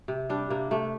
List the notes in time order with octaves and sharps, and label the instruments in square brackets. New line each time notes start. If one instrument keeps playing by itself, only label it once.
[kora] C3
G3 D4
C3 A#3
C3 A3